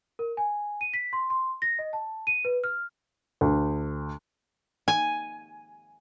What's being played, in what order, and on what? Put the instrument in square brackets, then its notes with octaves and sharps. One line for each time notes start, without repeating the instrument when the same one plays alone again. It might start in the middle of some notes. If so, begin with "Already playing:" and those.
[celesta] A#4
G#5
D#7
B6
C6
C6
A#6
D#5
A5
D#7
B4
F6
[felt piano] D2
[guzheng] G#5